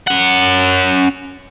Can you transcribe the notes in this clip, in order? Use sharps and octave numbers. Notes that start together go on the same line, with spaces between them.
C#4 F#5